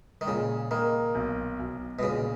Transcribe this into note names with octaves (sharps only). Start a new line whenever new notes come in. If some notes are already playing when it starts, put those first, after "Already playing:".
D#3
A#2 C#3
D#3 A#3
B1
B1
B2
A#2 C#3